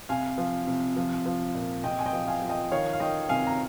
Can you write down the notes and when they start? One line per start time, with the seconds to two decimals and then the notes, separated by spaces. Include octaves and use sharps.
0.09 C3 F5 G#5
0.38 F3
0.67 C3
0.96 F3
1.26 F3
1.55 A#2
1.84 C3 D#5 G5
1.99 G#5
2.06 D#5 G5
2.13 F3
2.27 F5 G#5
2.42 F3
2.49 D#5 G5
2.71 D#3 C#5 F5
2.93 F5
3.00 D#3 D#5 G5
3.29 C3 F5 G#5
3.47 A#5